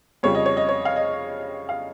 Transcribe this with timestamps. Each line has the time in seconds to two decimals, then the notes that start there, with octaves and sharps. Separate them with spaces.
0.23 F2 C#3 G3 C#5
0.35 D#5
0.46 C#5
0.57 D#5
0.69 C#5
0.85 F5
0.96 D#5
1.69 F5